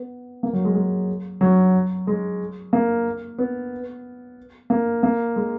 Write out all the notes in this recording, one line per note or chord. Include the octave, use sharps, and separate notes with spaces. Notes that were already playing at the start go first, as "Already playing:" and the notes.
Already playing: B3
A#3
F#3
G#3
G#3
F#3
G#3
A#3
B3
A#3
A#3
G#3